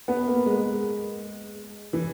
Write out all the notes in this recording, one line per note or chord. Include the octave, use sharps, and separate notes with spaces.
B3
A#3
G#3
E3